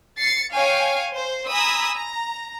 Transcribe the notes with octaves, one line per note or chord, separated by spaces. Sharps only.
A6 C7 C#7
C#5 F5 G5 G#5
C5
G#5 A#5 B5 D#6 E6
A#5